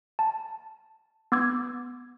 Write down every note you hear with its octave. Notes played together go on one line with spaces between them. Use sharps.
A5
B3 D6 E6 G#6